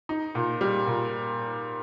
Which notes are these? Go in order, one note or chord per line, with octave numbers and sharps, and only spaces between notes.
D#4
A#2
G3
A#2